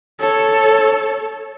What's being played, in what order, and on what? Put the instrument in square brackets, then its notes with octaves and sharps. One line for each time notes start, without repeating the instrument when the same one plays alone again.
[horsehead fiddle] A4 C#5